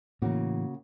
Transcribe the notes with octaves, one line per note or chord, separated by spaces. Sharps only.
A2 C#3 E3 A#3 F#4